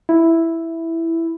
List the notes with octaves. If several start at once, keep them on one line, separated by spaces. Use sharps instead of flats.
E4